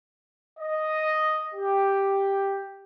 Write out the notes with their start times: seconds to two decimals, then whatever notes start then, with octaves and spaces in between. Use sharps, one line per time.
0.60 D#5
1.54 G4